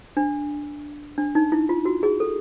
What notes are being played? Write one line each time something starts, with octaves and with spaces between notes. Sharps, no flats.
D4
D4
D#4
E4
F4
F#4
G#4
A4